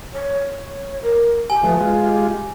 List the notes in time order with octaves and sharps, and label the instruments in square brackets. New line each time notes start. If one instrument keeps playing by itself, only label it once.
[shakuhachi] C#5
A#4
[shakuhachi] G4 [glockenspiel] G#5
[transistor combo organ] F3 A3 [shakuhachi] B4
[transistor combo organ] G#3 F4
[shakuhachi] G4